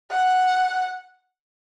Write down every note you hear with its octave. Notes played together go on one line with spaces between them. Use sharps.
F#5